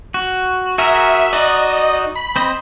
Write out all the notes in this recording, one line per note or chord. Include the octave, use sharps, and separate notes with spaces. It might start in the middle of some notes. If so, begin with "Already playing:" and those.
F#4
F#4 G#4 A#4 E5
D#4 F#4 D5 D#5
B5
C4 C5 D#5